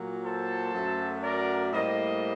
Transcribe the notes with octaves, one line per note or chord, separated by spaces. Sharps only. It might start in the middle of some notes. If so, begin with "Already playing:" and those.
Already playing: A#2 F#3 A#3
A4 C5
F#2 F#3 A3
A#4 D5
A2 G3 A#3 C5 D#5